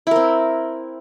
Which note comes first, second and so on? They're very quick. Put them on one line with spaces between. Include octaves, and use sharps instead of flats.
E4 A#4 C4